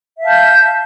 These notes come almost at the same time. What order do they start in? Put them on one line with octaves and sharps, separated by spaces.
E5 F5 A5 G6